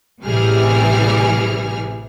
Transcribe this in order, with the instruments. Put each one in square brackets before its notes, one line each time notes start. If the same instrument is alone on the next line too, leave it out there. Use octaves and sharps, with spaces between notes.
[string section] A1 C3 E3 G3 G#4 F6